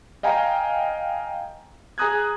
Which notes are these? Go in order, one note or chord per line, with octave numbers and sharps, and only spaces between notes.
D#5 F5 G5 G#5 A#5
G#4 G#5 A#5 D#6 F#6 G#6